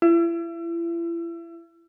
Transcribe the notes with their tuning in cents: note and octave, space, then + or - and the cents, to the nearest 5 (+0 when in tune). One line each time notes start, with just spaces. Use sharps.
E4 +35